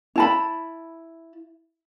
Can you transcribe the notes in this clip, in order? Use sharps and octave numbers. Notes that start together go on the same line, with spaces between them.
E4 A5 B5